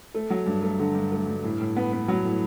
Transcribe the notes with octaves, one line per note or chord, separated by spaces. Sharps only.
A3
F#3
G2
A3
D3
G2
A3
G2
A2
A2
B3
B3
F#3
A2